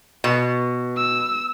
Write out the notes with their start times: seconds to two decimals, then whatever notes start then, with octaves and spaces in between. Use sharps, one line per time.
0.24 B2
0.97 E6